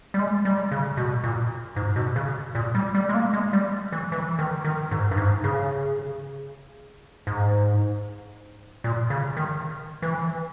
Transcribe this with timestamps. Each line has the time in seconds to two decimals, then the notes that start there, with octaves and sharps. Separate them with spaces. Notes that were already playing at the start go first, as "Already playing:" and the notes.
0.14 G3
0.19 G#3
0.45 G3
0.71 C#3
0.97 B2
1.24 A#2
1.76 G#2
1.96 B2
2.16 C#3
2.55 A#2
2.75 G3
2.95 G3
3.09 G#3
3.14 A#3
3.33 G#3
3.53 G3
3.92 E3
4.12 E3
4.39 D#3
4.64 D#3
4.91 G#2
5.11 G2
5.17 G#2
5.44 C#3
7.27 G#2
8.84 A#2
9.10 C#3
9.37 D#3
10.02 E3